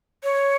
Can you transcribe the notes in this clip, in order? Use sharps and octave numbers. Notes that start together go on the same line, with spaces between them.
C#5